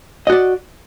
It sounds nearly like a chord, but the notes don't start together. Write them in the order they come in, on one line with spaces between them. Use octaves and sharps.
D#5 F#4 D5